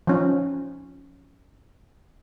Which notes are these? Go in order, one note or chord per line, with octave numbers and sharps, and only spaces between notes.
F3 C#4 D#4